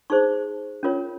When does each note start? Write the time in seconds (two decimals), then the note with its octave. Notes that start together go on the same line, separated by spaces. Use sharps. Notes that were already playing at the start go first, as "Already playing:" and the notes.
0.10 D#4 G#4 C5 C#6
0.83 C#4 F4 A#4 C#5